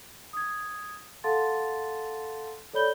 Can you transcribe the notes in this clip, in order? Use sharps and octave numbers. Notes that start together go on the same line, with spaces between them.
D#6 G#6
A4 F5 F#5 A5 C6 A6
A4 C#5 D5 B5 G6 G7